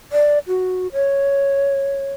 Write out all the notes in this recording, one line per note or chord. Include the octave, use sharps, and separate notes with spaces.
D5
F#4
C#5